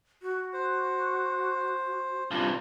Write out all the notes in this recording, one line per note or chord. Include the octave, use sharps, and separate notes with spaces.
F#4
C5
G2 C3 F4